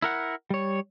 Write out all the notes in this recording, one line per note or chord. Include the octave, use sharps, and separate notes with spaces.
E4 A#4 F#5
G3 C#5